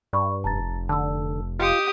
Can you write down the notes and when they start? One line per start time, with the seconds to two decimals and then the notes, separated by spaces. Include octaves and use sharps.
0.13 G2 D5 B5 C#6
0.44 F1 A5 A#5 A6
0.89 D3 A5 E6
1.59 F4 G4 D#5 D#6 C#7